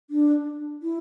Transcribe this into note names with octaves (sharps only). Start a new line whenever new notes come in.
D4
E4